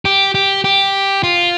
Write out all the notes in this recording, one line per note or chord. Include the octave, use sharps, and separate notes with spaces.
G4
G4
G4
F4